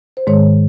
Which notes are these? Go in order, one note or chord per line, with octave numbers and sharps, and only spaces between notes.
C5
G#2 D#3 G#3 C#5